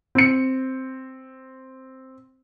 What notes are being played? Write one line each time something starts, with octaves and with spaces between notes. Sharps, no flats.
C4 C#7